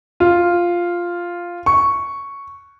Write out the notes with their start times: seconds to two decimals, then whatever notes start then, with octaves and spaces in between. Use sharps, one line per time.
0.20 F4
1.66 C#6